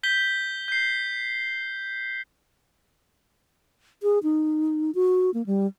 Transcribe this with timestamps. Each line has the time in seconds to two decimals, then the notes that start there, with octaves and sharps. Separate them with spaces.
0.03 G6 B6 G7
0.68 G6 C7
4.03 G#4
4.23 D#4
4.95 F#4
5.34 A#3
5.46 G3